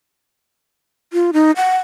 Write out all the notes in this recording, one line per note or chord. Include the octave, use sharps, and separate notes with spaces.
F4
D#4
F#5